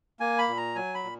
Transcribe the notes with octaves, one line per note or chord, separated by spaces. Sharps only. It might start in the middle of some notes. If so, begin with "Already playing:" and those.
A#3 G#5
B5
A#2
A#5
F#3 G#5
B5
A#2